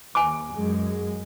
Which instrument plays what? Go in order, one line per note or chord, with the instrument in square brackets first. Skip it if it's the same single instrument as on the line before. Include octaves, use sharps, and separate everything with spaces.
[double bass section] D#2 [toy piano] G#5 D6
[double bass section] F#2 G#3